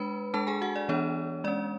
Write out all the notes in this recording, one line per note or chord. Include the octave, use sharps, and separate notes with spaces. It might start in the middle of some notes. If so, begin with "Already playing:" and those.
Already playing: G#3 D4 B4 B5
G#3 D4 A4 A5
G#4 G#5
F#4 F#5
D5
E3 B3 D4 C#5
G#3 C#4 D5